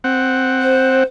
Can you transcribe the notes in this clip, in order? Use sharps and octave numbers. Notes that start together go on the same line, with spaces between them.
C4 F#5
C5